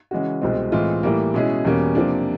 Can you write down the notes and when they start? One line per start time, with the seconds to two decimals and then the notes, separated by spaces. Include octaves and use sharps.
0.11 C#3 E3 G#3 C#4 F#4
0.42 C2 B2 G#3 C4
0.72 A2 E3 G#3 C4 F4
1.03 A2 E3 G3 A#3
1.34 B2 G#3 C#4 E4 G#4
1.65 E2 B2 G3 A#3 C#4
1.95 C3 F3 A#3 D4